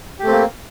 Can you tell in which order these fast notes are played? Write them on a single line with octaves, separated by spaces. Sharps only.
G4 A3 C4 A#3